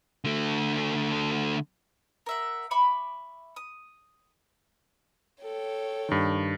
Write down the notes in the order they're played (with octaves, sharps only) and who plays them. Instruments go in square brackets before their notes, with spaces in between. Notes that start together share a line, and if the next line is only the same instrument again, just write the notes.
[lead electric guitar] D3 A3
[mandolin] A#4 E5 F#5
E5 B5 C#6 D6
D#6
[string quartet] A4 C#5 G5
[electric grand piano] G2 D#3